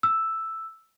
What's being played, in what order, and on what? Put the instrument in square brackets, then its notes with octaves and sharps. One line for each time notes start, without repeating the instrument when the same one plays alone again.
[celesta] E6